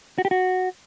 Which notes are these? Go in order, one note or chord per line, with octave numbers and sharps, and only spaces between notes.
F#4
G4
F#4